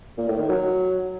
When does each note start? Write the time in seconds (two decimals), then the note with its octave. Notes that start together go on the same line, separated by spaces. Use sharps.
0.18 A#2
0.28 A2
0.39 D#3
0.49 F#3